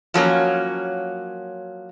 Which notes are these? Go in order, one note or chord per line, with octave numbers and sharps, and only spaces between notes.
F3 F#3 A#3 C#4